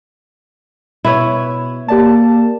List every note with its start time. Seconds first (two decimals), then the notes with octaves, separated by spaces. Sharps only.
1.05 B2 E4 B4 C#5
1.88 A#3 G4 D5 A5